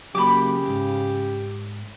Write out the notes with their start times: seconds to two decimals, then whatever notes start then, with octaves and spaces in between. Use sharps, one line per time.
0.15 C#3 F#3 A#3 G4 B5 D6
0.65 D2 G#2